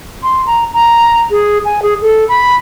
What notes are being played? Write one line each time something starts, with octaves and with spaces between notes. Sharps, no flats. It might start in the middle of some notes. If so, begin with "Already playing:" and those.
C6
A#5
A#5
G#4
G#5
G#4
A4
B5